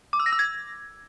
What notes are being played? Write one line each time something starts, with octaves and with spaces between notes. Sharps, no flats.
D6
E6
A#6
E6
G#6